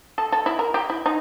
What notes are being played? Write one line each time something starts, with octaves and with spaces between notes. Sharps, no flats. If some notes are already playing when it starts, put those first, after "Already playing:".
A4
A4
E4
A#4
G4
E4
D#4